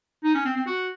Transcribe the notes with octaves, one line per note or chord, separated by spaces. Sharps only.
D#4
C#4
C4
C4
F#4